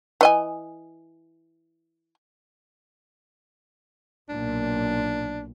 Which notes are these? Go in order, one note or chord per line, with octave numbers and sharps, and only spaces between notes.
E3 D#5 G#5
B1 A#2 D4